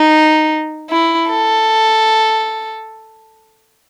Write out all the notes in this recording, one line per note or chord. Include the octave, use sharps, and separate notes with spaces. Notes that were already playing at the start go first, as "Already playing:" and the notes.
Already playing: D#4
E4
A4